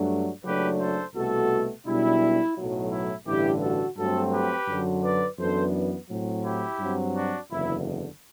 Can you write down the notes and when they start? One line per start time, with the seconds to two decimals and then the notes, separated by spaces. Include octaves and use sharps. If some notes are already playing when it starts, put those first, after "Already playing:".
Already playing: G2 F#3 A3 D4
0.44 F#1 F#2 F#3 A3 D4 G4 B4
0.79 A4 C5
1.14 C2 B2 A3 F#4 A4
1.85 B1 B2 G3 D4 E4
2.56 B1 A2 F#3
2.91 E4
3.26 A1 G2 D3 E4 G4
3.62 F#4 A4
3.97 G2 F#3 A3 C4 F#4 A4
4.32 G4 B4
4.68 F#2 D3 F#3
5.03 B4 D5
5.39 F#2 E3 B3 D4 A4 C5
6.09 A2 F#3 C4
6.44 E4 G4
6.79 G2 F#3 C4
7.15 D4 F#4
7.51 F#1 E2 D3 E4